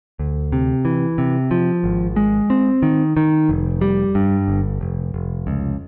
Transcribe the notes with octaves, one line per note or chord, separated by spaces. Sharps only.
D2
C3
E3
C3
F3
G#1
G#3
C4
D#3
D#3
F1
G3
G2
G1
F1
F1
C#2